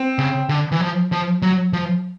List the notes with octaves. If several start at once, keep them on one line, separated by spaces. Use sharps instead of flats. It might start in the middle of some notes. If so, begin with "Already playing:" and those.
Already playing: C4
C#3
D3
E3
F3
F3
F#3
F3